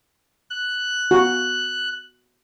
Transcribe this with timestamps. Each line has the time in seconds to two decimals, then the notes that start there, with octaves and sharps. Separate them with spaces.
0.50 F#6
1.11 F#4